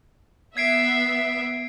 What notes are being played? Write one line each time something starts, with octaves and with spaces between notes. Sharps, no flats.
B3 E5 G#6 C7 D7